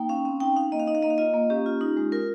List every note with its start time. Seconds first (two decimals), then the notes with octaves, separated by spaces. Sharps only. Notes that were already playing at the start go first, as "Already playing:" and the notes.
Already playing: A#3 D#4 G5
0.09 C#4 F5
0.25 C4 F5
0.40 D#4 G5
0.56 D#4 F5
0.72 A#3 D#5
0.80 F5
0.87 D#4 D#5
0.95 F5
1.03 A#3 D#5
1.10 F5
1.18 F4 D#5
1.34 A#3
1.50 C#4 G4
1.66 F4
1.81 D#4
1.97 G#3
2.12 F4 A#4